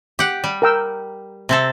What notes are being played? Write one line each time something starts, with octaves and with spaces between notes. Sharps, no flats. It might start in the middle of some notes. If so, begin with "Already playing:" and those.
G4 F#5
G3
A#4 G5 E6
C3 C4 A4